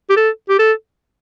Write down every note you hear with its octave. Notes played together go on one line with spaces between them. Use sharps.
G4
A4
G4
A4